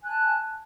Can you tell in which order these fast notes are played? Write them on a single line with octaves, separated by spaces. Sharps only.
G#5 F#6 A5